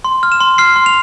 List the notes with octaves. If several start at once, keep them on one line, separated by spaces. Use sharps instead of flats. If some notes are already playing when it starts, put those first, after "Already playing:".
C6
F6
E7
C6
F6 C7
C6
F7